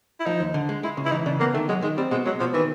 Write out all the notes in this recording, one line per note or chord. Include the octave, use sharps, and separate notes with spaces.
E4
F3 D#4
D#2
D3
G#3
G#3 E4
C#3
E4
E3 D#4
C#3 D4
A#3 B3
D#3 A3
F#3 G#3
D#3 G#3
G3 C4
B2 G#3
F#3 G#3
B2 F3
D#3 E3